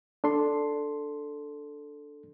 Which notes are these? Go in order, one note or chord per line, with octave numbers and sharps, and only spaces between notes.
D4 A4 C6